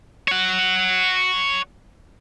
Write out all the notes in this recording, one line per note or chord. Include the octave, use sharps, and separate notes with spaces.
C#5 F#5